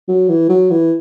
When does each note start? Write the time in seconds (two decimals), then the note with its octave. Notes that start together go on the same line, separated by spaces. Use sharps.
0.08 F#3
0.29 E3
0.49 F#3
0.71 E3